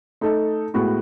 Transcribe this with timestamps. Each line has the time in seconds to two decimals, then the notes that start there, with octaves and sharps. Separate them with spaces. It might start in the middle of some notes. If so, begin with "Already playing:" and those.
0.21 A3 D#4 A4
0.74 A2 G#3 B3 F#4